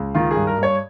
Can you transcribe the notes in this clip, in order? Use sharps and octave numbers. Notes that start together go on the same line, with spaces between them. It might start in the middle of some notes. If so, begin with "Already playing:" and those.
Already playing: C#2
D#3 F4
G#4
G2
A#4
G2 C#5